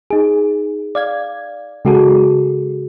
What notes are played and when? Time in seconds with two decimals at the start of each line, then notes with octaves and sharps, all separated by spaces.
0.10 D#4 G#4
0.95 D5 F5 G#6
1.85 C#3 G#3 F#4 G#4 A4